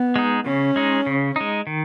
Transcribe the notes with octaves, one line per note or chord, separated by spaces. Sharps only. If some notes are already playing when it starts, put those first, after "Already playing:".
Already playing: B3
G#3 D#4
C#3 C#4
G#3 D#4
C#3
G#3 D#4
D#3